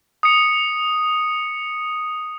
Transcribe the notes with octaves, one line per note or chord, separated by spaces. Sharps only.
D#6 C#7